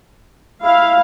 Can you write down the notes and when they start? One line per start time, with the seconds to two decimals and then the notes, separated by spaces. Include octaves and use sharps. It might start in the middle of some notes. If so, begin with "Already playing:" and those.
0.64 E4 F5